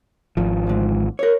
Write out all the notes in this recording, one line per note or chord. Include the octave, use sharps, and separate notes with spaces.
G#1 F3
D2 G#2
A#4 C#5